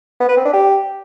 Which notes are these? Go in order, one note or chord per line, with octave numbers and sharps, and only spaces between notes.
B3
B4
C4
D4
G4